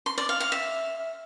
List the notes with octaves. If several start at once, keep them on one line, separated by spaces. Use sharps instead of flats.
C6
D5
F5
F5
E5